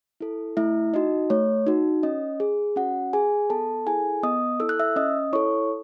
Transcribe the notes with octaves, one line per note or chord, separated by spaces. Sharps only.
E4 A4
A3 E4 E5
D#4 F#4 D#5
A3 C#5
D#4 F#4
C#4 D#5
G#4
C#4 F#4 F#5
G#4 G#5
B3 A4 A5
E4 G#4 A4 G#5
B3 D#5 D#6
E4 A4 E6
F#6
E5 E6
C#4 D#5 D#6
E4 A4 C#5 C#6